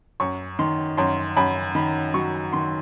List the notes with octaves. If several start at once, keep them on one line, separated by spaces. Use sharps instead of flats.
F#2 C#6
D#3 C6
F#2 C6
F#2 B5
D#3 B5
F#3 C#6
D#3 C6